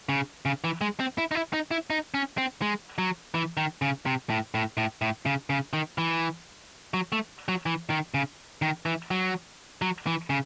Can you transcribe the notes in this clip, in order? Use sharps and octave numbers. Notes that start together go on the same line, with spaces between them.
C#3
C#3
E3
G#3
C4
E4
D#4
E4
D#4
E4
D#4
C#4
C4
G#3
F#3
E3
D#3
C#3
C3
A2
A2
A2
A2
C#3
C#3
D#3
E3
F#3
A3
F#3
E3
D#3
C#3
D#3
E3
F#3
F#3
E3
C#3